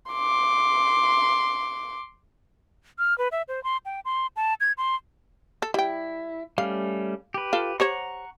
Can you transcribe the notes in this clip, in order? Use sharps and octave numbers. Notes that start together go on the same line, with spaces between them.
C6 D6
F6
B4
E5
C5
C6
G5
C6
A5
G#6
C6
A4
G3 E4 G5
G3 A3 C#4 F5
G4 B4
F4 A4 F5
G4 C5 C#5 F#5 A#5 C#6